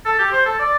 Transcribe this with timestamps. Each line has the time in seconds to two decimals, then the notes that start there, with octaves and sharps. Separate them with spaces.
0.05 A4
0.19 G4
0.32 C5
0.45 A4
0.59 D5